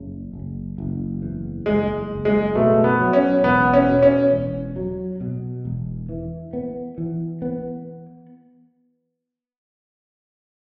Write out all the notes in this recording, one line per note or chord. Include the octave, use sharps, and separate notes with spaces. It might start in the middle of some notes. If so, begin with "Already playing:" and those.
Already playing: F#1 C#3
F#1
F#1
E2
F#1 G#3
F#1
G#3
B2 A3
B3
F#3
C#4
E1 B3
C#4
B2
C#4
E1
F#3
B2
E1
E3
B3
E3
B3